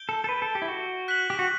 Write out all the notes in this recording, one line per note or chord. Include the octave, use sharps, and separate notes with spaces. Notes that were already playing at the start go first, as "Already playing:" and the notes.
Already playing: G6 D7 G7
A4
A4
B4
A4
G4
E4
F#4
F#6 B6 F#7
G4
F#4